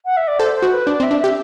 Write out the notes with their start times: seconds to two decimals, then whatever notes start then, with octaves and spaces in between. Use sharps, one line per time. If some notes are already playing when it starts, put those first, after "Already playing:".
0.05 F#5
0.17 E5
0.28 D5
0.39 A4 C5
0.55 C5
0.62 F#4
0.71 B4
0.87 D4 D5
1.00 C4
1.03 E5
1.11 D4
1.19 G4 E5